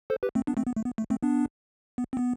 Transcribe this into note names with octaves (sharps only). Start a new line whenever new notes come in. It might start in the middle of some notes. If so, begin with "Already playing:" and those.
A4 C5
G4 B4
A3 C4
B3 D4
A3 C4
B3
A3
B3
A3
A3 C4
B3 D4
B3
C4
B3